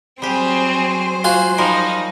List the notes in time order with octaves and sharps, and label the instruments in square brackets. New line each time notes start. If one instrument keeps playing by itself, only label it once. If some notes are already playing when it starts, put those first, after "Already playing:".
[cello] F#3 C5 [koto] G3 G4 [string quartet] C4 G#4
[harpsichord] F4 F#4 G#5
[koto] F3 G3 A#4 [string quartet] D#4